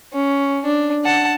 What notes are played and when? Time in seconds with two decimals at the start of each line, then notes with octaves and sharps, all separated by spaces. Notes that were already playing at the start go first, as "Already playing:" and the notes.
0.13 C#4
0.65 D4
1.04 F#5 A5